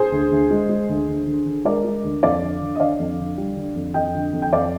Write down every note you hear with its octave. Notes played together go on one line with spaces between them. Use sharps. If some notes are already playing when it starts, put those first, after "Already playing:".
Already playing: G#4 C5
D2
D2
G#3
G#3
D2
D2
D3
D3
G#3 A#4 D5
G#3
D2
F2 D5 F5
D3
D3
D#5
D3 D5 F5
F2
D3
G3
D3
F2
F2 D#5 G5
D3
F2
G5
F2 D5 F5